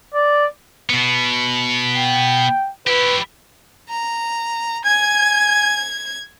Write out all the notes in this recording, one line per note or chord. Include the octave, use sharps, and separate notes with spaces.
D5
B2 B3
G5
E4 G4 B4
A#5
G#5 G#6